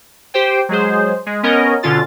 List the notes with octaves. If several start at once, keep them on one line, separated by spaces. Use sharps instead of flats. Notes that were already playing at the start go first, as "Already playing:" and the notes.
G4 C5 G5
F#3 G#3 G#4 C5
G#3
B3 C#4 A#4 C#5 D#5
B2 D3 C#4 F4 A6